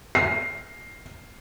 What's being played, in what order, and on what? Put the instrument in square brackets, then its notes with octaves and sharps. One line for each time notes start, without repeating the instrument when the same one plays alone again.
[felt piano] C7